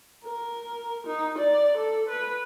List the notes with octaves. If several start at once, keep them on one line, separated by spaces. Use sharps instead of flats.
A#4
D#4
D5
A4
B4